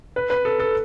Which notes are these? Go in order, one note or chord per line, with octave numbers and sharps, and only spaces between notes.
B4
B4
A4
A4